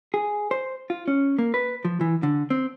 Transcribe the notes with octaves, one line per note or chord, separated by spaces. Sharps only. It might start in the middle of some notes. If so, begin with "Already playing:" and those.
G#4
C5
F4
C#4
A#3
B4
F3
E3
D3
C4